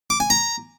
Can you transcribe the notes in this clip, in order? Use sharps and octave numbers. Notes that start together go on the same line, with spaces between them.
D6
G#5
A#5